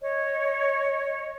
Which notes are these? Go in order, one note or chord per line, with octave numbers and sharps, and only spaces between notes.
C#5 D#5